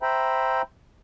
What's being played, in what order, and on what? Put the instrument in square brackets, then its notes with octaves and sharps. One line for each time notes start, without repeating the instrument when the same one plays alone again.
[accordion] C5 E5 G5 A#5 B5